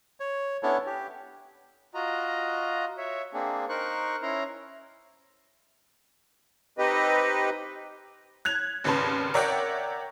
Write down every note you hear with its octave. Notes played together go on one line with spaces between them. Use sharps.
C#5
B3 C#4 D4 E4 A4 C#5
G4
F4 F#4 D#5 A#5
C#5 E5
A#3 C4 D4 G#4
D#4 A#4 C5 C#6 F#6
C#4 E4 A#5 C6
C4 D#4 G4 B4 D#5
F#6 G#6 F7
G#1 D#2 C#3 B4 A5 C6
A#4 C#5 D5 E5 F#5 G5